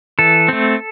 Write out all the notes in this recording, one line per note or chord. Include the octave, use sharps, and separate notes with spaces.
E3 A4
A3 C4